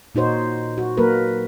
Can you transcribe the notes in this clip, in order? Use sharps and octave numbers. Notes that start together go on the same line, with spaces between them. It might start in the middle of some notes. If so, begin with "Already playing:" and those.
A#2 D#4 F#4 C5 C#5
F#4
F#3 A#3 A#4 B4